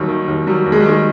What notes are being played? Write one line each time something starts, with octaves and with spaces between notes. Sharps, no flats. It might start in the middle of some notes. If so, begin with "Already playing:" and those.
Already playing: D#2 F#3 G3
D#3
D#2
F#3 G3
D#2
G#3
G3
D#3 G#3